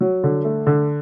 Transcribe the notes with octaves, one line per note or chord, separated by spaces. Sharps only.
F#3
D3
A3
D3